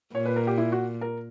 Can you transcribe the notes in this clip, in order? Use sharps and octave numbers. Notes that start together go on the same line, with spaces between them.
A#2 C#5
B4
A#4
G4
E4
F#4
A#4